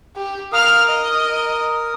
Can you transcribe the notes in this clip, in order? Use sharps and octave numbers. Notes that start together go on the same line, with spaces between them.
G4
A#4 F5 D#6 F6
D#5